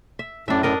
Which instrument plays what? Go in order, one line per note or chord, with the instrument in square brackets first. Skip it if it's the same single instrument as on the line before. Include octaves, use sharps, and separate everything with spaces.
[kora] E5
[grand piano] F#2 [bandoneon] A2 [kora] D4 E5
[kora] D4 A#4 D#5